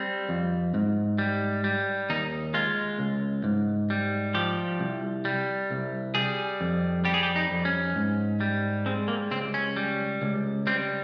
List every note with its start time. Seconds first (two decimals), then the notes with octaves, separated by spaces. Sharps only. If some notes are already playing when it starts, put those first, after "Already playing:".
Already playing: G3 C4
0.29 F2
0.74 G#2
1.18 G3
1.64 G3
2.10 D#2 D#4
2.54 G#3 F4
2.99 C#2
3.44 G#2
3.90 G3
4.34 F3 G4
4.79 C2
5.25 G3
5.71 C2
6.15 G3 G#4
6.61 F2
7.05 G3 G4
7.14 G#4
7.23 G4
7.36 D#4
7.51 F2
7.65 C#4
7.96 G#2
8.41 G3
8.86 G#3 C4
9.08 A#3
9.31 C#2 C4
9.54 C#4
9.76 G3
10.22 C#2
10.67 G3 C4